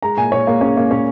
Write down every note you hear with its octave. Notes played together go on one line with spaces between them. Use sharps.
G#3 A#5
A#2 G#5
A#2 C#5
G#3 A#3
G#3 C#4
G#3 A#3
A#2 C#4